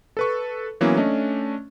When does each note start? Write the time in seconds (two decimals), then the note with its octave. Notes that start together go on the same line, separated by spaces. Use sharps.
0.17 A4 B4 C#6
0.81 E3 F#3 A#3 B3 C#4 E4
0.97 A3 C#4 D4 D#5